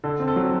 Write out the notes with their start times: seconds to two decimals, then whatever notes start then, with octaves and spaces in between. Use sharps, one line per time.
0.04 D3 A4
0.20 C4
0.28 A4
0.36 F#3